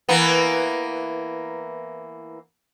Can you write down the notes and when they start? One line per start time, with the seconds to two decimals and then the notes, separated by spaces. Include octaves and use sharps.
0.09 E3 A#3 B3